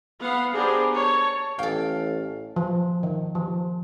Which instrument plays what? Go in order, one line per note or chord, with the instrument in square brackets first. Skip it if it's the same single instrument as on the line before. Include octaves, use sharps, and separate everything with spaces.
[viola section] B3 F5 F#5
B3 D4 G4 G#4 A#4 C5
C#5 A5
[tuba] A1 [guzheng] A4 G5 [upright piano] F5
[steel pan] F3
D#3
F3